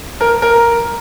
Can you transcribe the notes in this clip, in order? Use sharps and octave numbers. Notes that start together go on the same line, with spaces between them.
A#4
A#4